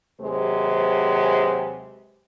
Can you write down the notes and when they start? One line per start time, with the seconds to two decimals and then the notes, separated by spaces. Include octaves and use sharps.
0.20 D#2 C3 F#3 G#3 B4 C5